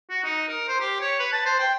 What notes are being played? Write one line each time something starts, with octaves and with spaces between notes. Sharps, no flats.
F#4
D#4
A#4
C5
G4
C#5
B4
A5
C5
G5